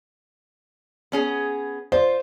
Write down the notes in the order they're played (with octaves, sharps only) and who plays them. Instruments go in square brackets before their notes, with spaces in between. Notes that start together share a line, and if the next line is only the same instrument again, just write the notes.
[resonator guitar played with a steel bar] B3 C#4 G#4
[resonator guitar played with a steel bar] F4 [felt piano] C5 D5